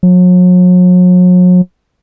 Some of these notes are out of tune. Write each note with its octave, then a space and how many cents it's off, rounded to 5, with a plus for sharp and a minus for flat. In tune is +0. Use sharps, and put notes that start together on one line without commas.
F#3 -40